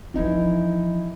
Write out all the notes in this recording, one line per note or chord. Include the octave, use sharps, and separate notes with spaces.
E2 E3 F3 D#4 E4